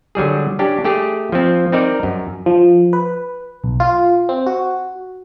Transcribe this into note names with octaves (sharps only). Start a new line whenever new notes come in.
D3 F#3 G3 G#4
C#4 D4 G4
A3 G4 G#4
F3 C4
C4 D#4 A#4 D5
F#2
F3
B4
B1
F4
C4
F#4